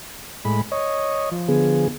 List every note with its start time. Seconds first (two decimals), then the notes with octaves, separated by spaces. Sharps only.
0.45 A2 G#3 B5
0.72 C#5 D#5
1.31 F3
1.48 D3 B3 G#4